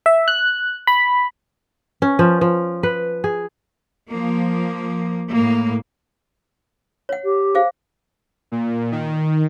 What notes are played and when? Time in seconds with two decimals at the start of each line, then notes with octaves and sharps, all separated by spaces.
0.06 E5
0.28 F#6
0.87 B5
2.02 C#4
2.19 F3
2.41 F3
2.83 B4
3.24 G#4
4.09 F3 A#3
5.32 A2 A#3
7.09 C#5 F#5
7.24 G4
7.55 G#4 C5 F5
8.52 A#2
8.92 D#3